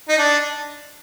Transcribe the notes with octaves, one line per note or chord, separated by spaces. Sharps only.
D#4
D4